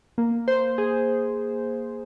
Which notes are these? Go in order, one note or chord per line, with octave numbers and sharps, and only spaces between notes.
A#3
C5
G#4